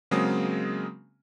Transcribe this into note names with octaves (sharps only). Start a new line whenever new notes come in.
C#3 F#3 G#3 A#3 C4 D#6